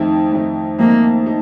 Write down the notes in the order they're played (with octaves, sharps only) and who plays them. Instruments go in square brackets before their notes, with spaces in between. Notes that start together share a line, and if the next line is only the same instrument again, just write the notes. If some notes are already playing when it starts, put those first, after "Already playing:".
Already playing: [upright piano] F2 D#3 A3 D#4
F2 D#3 A3 D#4
[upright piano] F2 D#3 A3 D#4 [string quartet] A#3
[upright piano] D#4